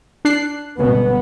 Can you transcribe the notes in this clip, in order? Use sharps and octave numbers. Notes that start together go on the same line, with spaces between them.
D4 F#6 C7
G1 C#2 B2 B3